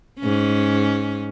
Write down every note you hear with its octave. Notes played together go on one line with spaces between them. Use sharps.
G#2 C#4